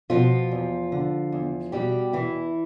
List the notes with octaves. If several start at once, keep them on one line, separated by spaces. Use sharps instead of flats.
B2 F3 F4
E2
D3
E2
B2 G3 G4
E2 E3 E4